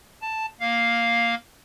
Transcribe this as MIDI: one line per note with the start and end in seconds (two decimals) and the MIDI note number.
0.22 0.46 81
0.60 1.35 58
0.60 1.35 77